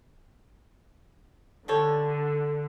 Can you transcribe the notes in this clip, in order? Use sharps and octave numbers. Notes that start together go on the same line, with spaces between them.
D3 G3 A4 C#5